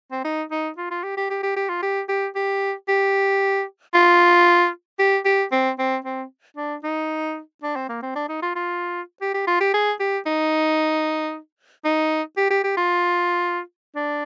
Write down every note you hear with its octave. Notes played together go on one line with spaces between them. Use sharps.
C4
D#4
D#4
F4
F4
G4
G4
G4
G4
G4
F4
G4
G4
G4
G4
F4
G4
G4
C4
C4
C4
D4
D#4
D4
C4
A#3
C4
D4
D#4
F4
F4
G4
G4
F4
G4
G#4
G4
D#4
D#4
G4
G4
G4
F4
D4